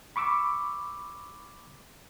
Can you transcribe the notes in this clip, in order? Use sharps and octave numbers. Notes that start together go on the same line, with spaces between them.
B5 C#6 D6 E6